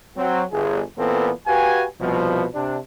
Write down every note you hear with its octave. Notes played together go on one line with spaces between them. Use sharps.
F#3 C4
G1 G#4
A#2 E3 B3 C4 A4
F#4 G4 B4 F5 G#5
C2 B2 F3
C3 D4